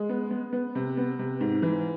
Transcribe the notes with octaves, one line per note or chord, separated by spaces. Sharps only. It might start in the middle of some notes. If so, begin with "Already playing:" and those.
Already playing: G#3
B3
B3
B3
C3
B3
C3
G#2
E3